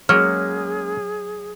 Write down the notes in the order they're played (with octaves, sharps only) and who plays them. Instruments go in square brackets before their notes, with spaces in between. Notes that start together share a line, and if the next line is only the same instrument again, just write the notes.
[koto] F#3 [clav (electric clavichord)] G#3 A#3 C#4 [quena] G#4 [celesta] F6